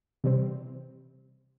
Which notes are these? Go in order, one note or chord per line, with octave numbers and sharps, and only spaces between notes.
C3 E3 G3 C4